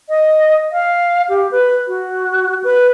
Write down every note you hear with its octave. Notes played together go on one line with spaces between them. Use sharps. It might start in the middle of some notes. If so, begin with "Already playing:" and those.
D#5
F5
G4
B4
F#4
B4